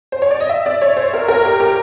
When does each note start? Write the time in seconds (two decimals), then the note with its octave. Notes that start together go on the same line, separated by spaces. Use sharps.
0.12 C5
0.22 C#5
0.31 D5
0.40 D#5
0.49 E5
0.66 D5
0.81 C#5
0.97 C5
1.14 A#4
1.28 A#4
1.45 G4
1.60 G4